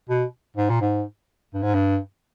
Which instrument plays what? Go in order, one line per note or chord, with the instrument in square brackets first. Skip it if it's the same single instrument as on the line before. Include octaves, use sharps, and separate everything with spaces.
[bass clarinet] B2
G#2
A#2
G#2
G2
G#2
G2